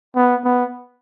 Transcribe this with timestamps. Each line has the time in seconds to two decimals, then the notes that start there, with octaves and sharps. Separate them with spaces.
0.16 B3
0.44 B3